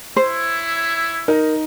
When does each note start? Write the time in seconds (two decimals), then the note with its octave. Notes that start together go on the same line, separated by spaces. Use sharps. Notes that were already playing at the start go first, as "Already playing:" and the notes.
0.16 E4 C5 C#5 E5
1.28 D#4 A#4